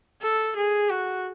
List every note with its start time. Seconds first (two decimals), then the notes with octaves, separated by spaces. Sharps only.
0.22 A4
0.56 G#4
0.89 F#4